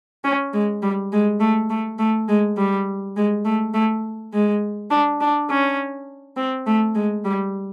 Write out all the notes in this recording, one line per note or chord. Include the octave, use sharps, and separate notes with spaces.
C#4
G#3
G3
G#3
A3
A3
A3
G#3
G3
G#3
A3
A3
G#3
D4
D4
C#4
C4
A3
G#3
G3